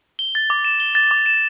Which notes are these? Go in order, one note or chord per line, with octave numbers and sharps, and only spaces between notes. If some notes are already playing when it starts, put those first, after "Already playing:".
G7
A6
D6
E7
G7
A6
D6
E7